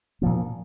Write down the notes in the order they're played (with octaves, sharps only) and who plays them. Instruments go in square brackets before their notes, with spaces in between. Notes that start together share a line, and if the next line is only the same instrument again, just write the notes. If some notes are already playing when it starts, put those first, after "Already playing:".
[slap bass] A#2 F3 A#3